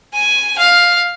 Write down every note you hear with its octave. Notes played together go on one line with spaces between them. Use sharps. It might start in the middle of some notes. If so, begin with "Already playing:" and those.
G#5
F5